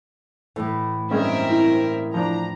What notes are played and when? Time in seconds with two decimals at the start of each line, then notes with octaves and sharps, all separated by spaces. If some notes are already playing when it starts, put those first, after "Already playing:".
0.56 A2 E3 A3
1.11 G2 G#3 C4 C#4 A#4 E5
1.50 E4
2.14 F3 D4 A#5